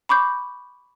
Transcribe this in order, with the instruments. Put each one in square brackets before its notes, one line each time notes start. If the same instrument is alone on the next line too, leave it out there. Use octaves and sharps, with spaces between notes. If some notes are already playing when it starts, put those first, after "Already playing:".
[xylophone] B5 C#6 D6 G6